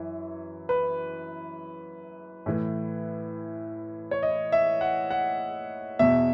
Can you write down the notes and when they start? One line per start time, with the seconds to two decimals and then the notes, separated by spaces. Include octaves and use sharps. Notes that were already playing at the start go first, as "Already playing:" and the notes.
Already playing: F#2 E3
0.69 B4
2.46 A2 E3
4.11 C#5
4.23 D#5
4.52 E5
4.81 F#5
5.10 F#5
5.99 E2 B2 E5